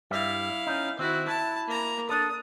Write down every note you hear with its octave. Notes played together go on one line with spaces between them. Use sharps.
G2 G3 E4 E5 F5
C#4 D#4
D#3 C4 E4 F#4
E4 A5
A#3 A#5
D4 A4 D#6